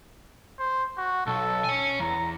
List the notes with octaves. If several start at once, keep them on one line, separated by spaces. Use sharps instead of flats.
C5
F#4
B1 A4
C#5 G#5
E2 A#5